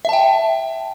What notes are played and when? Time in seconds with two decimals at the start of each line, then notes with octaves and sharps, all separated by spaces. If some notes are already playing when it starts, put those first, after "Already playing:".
0.05 E5
0.09 A5
0.13 G5